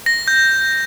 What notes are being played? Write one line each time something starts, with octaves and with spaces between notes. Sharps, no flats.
A#6
G6